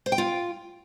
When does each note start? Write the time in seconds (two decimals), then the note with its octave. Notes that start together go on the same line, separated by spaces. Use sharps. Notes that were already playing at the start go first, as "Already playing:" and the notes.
0.06 C5
0.12 G5
0.18 F4